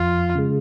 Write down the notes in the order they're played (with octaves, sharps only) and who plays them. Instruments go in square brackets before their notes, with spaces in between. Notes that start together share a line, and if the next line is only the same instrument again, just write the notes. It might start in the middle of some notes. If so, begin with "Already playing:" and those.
Already playing: [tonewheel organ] F2 [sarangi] F4
[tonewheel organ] C#3 G#3